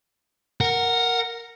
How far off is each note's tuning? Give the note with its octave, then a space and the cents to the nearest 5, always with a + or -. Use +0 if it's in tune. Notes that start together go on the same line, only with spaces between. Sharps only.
A#4 +0 F#5 +0